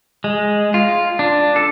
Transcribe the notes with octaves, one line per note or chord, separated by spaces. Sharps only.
G#3
F4
D4
A4